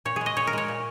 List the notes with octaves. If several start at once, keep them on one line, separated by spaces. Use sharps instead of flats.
A#2 C#5
G#3 G#4
D#5
A#2 C#5
A#4
G#3 C#5
A#2